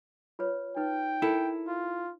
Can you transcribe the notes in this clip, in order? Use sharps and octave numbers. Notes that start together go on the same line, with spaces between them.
F4 B4 C#5
D#4 B4 G5
E4 A4 A#4
F4